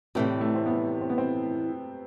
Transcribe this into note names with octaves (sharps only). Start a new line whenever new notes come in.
A2 C3 E3 G3
A3
C4
B3
C4
B3
C4